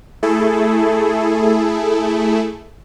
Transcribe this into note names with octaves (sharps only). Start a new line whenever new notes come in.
A3 E4 G#4 A4